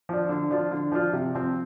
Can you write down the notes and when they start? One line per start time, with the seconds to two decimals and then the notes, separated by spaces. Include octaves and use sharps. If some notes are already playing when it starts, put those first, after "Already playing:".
0.09 F3 D4
0.29 D3
0.51 F3 D4 F4
0.71 D3
0.92 F3 D4 F4
1.13 C3
1.34 F3 C4